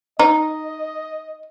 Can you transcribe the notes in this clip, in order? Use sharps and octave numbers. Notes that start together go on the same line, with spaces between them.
D#4 D#5